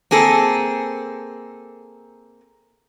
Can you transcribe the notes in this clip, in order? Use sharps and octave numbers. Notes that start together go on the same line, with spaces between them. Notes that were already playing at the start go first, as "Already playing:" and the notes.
A#3 C4 G#4 A4